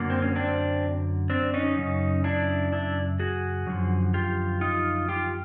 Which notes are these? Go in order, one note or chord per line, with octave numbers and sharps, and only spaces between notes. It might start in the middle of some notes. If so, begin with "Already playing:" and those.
Already playing: F#2 D3 F#3 A#3
C4
C#4
C4 D4
C4 D4
C#4 D#4
F#2 C#3
D4 E4
D4 E4
F#4 G#4
F#2 D3 F3
F4 G4
D#4 F4
F4 G4